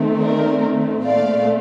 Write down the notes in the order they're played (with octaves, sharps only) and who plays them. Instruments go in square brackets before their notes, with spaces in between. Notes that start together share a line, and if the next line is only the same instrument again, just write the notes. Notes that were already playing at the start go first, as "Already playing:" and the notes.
Already playing: [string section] D#3 A3 C4
A#4 D5
A#2 A3 C4 D5 F5